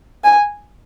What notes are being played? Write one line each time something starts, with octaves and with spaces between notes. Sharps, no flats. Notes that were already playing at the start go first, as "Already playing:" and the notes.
G#5